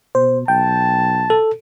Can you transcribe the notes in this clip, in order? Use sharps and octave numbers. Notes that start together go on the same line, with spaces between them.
B2 C5
B1 G5 A5
A4